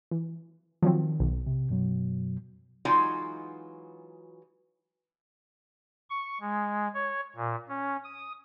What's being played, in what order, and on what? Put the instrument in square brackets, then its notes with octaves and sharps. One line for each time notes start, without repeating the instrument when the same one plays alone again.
[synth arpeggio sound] E3
[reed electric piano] D#3 [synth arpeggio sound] F3 F#3 C4
[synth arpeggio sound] B1
[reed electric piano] C3
F#2 B2 F#3
[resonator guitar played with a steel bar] E3 F#3 G#3 D#4 F4 F#4
[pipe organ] C#6
G#3
C#5
A#2
C#4
D#6